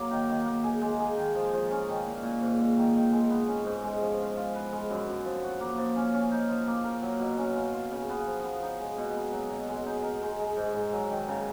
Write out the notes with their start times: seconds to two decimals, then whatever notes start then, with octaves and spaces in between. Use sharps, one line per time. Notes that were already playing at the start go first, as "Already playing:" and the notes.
Already playing: F#3 A#3
0.11 D#3
0.29 D#3
0.46 A#3
0.64 G#4
0.81 G#3
1.00 G#4
1.17 D#3
1.35 F3
1.53 F3
1.71 C#4
1.89 D#3
2.06 A#2
2.23 A#2
2.41 G#2
2.59 G#2
2.77 D#3
2.94 D#3
3.12 G#3
3.30 B3
3.48 C#4
3.65 G#2
3.84 G#3
4.01 F3
4.19 F4
4.37 F4
4.55 B4
4.72 G#3
4.90 F#2
5.08 F#2
5.25 F3
5.43 F#4
5.60 A#3
5.78 F3
5.96 C#4
6.14 C#4
6.31 D#4
6.49 F3
6.67 A#3
6.84 A#4
7.02 F#3
7.20 B2
7.38 C#4
7.56 F4
7.73 F4
7.92 C#3
8.09 B3
8.27 F3
8.44 B3
8.62 D#4
8.80 G#3
8.98 B2
9.16 B3
9.33 F#3
9.50 B2
9.68 G#3
9.86 D#4
10.03 A#4
10.22 G#3
10.39 G#3
10.57 G#2
10.74 G#2
10.93 F#3
11.10 D#3
11.28 C#3